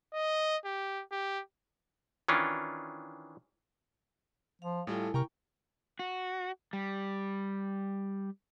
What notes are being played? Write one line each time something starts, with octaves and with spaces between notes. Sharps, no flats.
D#5
G4
G4
D#3 E3 C#4 D4 F4
F3 F5
A2 G3 E4 F4 A4 G#5
C3 A#4 G5 A#5 C#6
F#4
G3